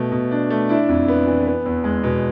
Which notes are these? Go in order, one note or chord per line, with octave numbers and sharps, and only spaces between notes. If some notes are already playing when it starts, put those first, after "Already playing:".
Already playing: B2 A3
B2
D4
A3
D4 E4
F2
B3
E3
B3
E2
G#3
B2